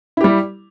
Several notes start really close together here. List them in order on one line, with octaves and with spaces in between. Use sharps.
E4 G4 G3